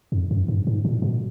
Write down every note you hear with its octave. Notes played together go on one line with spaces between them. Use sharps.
F2
F#2
G2
G#2
A#2
B2